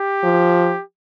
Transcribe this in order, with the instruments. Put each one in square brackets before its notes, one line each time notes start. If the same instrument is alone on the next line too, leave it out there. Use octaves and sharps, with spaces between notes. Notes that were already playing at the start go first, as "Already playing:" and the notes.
Already playing: [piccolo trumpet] G4
[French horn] F3